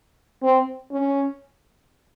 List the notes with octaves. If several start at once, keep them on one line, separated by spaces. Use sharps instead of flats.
C4
C#4